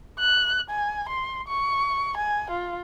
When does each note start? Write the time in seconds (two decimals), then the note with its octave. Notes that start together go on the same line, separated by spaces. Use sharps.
0.19 F#6
0.70 G#5
1.09 C6
1.48 C#6
2.17 G#5
2.50 F4